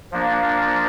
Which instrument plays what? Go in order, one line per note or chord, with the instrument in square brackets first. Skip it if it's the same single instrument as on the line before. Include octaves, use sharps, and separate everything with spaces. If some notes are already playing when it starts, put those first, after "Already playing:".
[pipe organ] F3 A#3 D4